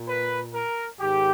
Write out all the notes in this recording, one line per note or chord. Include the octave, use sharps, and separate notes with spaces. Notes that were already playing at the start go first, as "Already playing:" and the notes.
Already playing: A#2
B4
A#4
G#2 D#3 G4